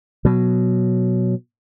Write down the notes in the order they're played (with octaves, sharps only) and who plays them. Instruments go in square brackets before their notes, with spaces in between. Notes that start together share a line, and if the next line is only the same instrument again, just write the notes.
[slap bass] B2 F#3